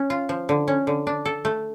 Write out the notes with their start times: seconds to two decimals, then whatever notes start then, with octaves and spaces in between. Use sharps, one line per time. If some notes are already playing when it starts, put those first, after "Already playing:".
Already playing: C#4
0.10 F4
0.29 F3
0.49 D3
0.68 C#4
0.87 D3
1.07 D4
1.25 A4
1.45 A3